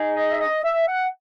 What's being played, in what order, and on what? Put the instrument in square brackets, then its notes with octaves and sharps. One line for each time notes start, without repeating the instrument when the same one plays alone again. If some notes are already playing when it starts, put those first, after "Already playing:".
Already playing: [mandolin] D#4 G#4
[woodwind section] D#5
E5
D#5
E5
F#5